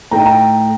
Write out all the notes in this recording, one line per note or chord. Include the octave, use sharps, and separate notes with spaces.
A2 A3 D#4 G5 A#5
G5 A#5